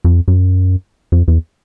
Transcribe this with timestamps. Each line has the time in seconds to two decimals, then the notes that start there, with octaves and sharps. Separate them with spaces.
0.05 F2
0.28 F#2
1.12 F2
1.28 E2